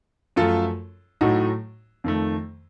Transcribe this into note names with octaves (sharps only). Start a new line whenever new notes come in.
F#2 F3 A3 F4 A4
A2 F#3 A3 D#4 F#4
F2 D#3 A3